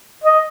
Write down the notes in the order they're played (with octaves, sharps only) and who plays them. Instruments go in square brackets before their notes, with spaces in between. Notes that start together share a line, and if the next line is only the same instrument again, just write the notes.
[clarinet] D#5